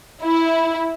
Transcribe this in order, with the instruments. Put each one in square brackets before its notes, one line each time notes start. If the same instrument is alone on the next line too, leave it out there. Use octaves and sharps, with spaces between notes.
[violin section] E4